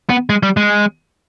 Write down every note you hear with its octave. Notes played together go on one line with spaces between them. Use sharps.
B3
G#3
G3
G#3